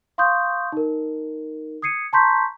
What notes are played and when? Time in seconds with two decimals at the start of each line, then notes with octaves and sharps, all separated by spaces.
0.18 F5 C6 C#6 D#6 G6
0.72 D#4 A#4
1.82 D#6 G#6 C7 C#7 D#7
2.13 A5 A#5 C6 C#6 G6 B6